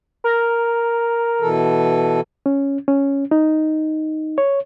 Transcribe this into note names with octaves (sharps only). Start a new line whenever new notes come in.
A#4
B2 E3 A4
C#4
C#4
D#4
C#5